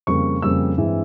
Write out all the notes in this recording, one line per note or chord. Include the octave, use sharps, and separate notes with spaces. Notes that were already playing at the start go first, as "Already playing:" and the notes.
F2 C#3 G3 A#3 C#6
F2 C#3 G3 A#3 E6
G2 E3 G#3 C4